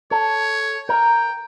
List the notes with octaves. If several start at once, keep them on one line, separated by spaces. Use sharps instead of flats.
A4 C#5
A#4 G5